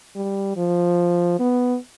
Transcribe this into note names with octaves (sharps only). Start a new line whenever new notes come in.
G3
F3
B3